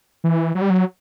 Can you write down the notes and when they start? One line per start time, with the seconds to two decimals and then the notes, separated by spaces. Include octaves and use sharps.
0.24 E3
0.55 F#3
0.62 G3
0.70 F#3